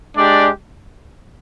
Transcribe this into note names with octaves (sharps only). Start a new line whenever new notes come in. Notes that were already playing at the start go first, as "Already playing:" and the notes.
G#3 D4 G4 D5